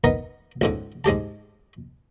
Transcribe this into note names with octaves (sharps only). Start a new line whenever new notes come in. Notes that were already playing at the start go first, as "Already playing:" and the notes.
B3 D#4 A#4 D#5
C#2 G#2 D3
G#2 G#3 G4 A5